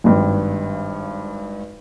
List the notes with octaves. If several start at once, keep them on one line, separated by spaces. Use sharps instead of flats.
G#1 G2